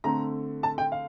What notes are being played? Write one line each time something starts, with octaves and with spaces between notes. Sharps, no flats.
D3 A3 C4 A#5
A5
G5
F5